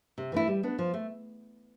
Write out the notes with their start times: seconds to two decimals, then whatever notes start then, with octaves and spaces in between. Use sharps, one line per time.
0.18 C3
0.32 E3 A3 E4
0.48 G3
0.63 B3 D4
0.79 F3
0.94 A3